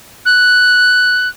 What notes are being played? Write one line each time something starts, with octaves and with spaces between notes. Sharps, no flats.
F#6